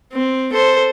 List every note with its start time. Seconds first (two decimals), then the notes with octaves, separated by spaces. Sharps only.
0.13 C4
0.53 A4 C5